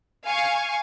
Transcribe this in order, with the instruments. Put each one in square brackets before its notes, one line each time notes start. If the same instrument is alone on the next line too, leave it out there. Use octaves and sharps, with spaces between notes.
[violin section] F5 G#5 C#6